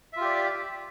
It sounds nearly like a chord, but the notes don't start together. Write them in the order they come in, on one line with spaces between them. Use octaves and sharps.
E5 F4 G4 D5